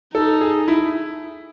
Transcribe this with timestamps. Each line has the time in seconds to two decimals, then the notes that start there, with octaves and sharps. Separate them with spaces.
0.14 D#4 A4
0.41 G#4
0.68 E4